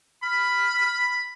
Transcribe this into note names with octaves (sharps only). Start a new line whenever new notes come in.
B5 F6